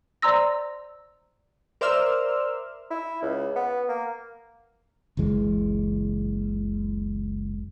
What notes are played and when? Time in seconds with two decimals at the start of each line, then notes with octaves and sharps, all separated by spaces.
0.22 C5 D5 A#5 C6 E6 A#6
1.81 A#4 C5 D5 E5 E6 F6
2.90 E4
3.22 C#2
3.55 B3
3.88 A#3
5.17 F#1 C#2 E3 G#3